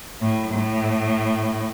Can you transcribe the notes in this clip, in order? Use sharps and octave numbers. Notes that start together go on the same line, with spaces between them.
A2
A2